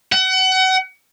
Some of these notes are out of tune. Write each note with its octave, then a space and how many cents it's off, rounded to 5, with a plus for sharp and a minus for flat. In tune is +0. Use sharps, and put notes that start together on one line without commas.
F#5 +30